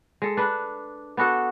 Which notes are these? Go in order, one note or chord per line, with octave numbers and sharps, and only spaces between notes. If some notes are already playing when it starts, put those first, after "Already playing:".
G#3 A4
D4 B4
B3 D4 F#4 A4